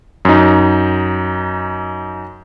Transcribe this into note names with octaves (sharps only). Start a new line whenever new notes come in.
F#2 D#4